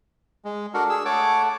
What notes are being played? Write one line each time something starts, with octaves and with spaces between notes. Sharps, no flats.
G#3
D4 F#4 A4 A#4
G#4 E6
A3 C#5 F#5 A5 D6